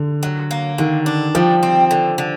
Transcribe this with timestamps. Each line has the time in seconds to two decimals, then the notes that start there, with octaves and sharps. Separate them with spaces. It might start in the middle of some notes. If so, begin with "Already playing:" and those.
Already playing: D3
0.23 F#3
0.51 A#3
0.78 D3 D#3
1.06 D4
1.35 F3 G3
1.63 C4
1.91 D3
2.18 D3